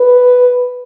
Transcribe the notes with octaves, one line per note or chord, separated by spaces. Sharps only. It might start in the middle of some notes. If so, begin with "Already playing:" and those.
Already playing: B4